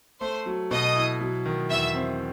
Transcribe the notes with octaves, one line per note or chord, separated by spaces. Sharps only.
A3 C5 C6
F#3
B2 D#5 D#6
E4
F#3
D#3
E2 E5 E6
C4